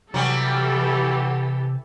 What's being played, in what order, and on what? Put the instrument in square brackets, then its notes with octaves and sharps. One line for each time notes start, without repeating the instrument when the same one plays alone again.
[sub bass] C3 [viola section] E3 G4 A4 [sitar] F#3 G3